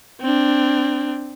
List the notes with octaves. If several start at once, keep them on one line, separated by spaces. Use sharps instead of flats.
C4 D4